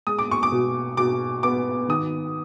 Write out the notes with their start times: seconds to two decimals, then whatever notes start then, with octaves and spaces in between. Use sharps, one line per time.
0.07 G#3 D#6
0.19 D6
0.31 C#6
0.43 D6
0.52 B2
0.97 B2 D6
1.43 B3 D6
1.89 D#3 D#6